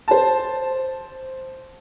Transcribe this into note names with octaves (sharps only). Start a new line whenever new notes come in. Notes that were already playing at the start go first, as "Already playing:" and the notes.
C5 A5